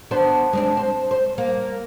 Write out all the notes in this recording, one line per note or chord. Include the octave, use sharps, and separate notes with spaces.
B3 D4 C5
G#3 C4 D4
C5
C5
A#3